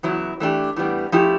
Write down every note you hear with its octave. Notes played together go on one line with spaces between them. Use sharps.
E2 C#3 F#3 B3 E4
E3 A3 D4 G4
A2 E3 G3 B3
F3 A3 C#4 E4 G4